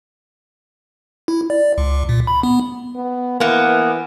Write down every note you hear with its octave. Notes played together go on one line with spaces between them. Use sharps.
E4
D5
C#2
A#2
B5
B3
B3
E3 A#3 B3